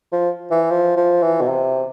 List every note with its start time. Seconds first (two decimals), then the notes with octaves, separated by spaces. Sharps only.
0.12 F3
0.51 E3
0.71 F3
0.97 F3
1.22 E3
1.41 B2
1.48 C3